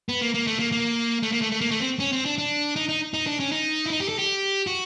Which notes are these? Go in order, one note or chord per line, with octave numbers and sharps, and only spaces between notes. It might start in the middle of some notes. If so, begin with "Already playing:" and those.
B3
A#3
A#3
A3
A#3
A#3
A3
A#3
A3
A3
A#3
A3
C4
C#4
C4
D4
D4
D#4
D#4
D#4
D4
C#4
D#4
E4
D#4
G4
A4
G4
F#4